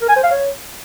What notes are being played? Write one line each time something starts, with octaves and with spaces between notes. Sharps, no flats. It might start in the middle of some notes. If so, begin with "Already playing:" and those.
A#4
G#5
C5
F5
C#5